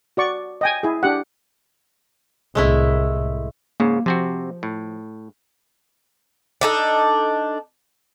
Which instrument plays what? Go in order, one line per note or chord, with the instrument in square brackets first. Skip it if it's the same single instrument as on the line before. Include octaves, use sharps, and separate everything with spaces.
[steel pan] F#4 D5 C#6
D#5 G5 G#5
E4 G#4
D4 G4 F#5
[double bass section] C2 A2 [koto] G#3 A3 E4
[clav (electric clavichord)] G#2 C#3 [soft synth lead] A#3
[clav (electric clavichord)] C3 C4 F#4 [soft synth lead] F3
[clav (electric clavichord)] A2
[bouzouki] D4 D#4 A4